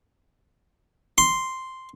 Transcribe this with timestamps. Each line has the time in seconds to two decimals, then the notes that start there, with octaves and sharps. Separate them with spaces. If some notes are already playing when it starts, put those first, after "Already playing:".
1.18 C6